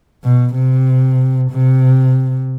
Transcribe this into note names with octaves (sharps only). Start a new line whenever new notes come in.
B2
C3
C3